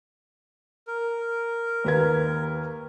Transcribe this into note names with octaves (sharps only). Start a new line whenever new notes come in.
A#4
D#2 B4 G#6